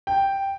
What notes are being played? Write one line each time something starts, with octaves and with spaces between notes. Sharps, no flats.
G5